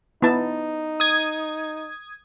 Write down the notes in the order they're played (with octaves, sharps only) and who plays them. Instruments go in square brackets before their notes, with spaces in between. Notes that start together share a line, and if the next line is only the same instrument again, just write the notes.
[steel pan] B3 E4 A5 [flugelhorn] D#4
[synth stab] D#6 G#6